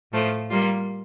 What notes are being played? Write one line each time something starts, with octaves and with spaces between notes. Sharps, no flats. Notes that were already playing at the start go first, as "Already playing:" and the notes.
A2 F3 A3
G3 A#3 F4